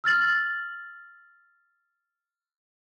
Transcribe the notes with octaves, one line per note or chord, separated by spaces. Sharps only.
E6 F6 A6 F#7